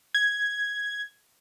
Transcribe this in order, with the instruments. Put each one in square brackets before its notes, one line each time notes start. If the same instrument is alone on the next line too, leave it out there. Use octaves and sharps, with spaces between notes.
[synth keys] G#6